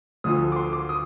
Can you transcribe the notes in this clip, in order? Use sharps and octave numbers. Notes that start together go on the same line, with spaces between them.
D2 D3 F3 D#6
D6
C6
D6
D#6